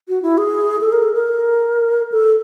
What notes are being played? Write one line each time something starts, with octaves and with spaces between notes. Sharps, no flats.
F#4
E4
G#4
A4
A#4
A4
A#4
A4